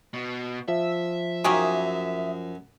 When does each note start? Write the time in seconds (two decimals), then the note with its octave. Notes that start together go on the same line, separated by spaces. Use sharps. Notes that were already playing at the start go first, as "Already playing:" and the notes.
0.14 B2
0.68 F3 E5
1.44 F#2 D#3 A#3 G#4